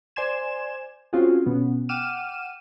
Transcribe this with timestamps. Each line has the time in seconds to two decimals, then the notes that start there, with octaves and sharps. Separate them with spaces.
0.16 C5 D5 G#5 C6 G#6 E7
1.13 C4 C#4 F4 F#4 G#4
1.46 B2 B3 C#4
1.89 F#5 G5 D6 F6 D#7 E7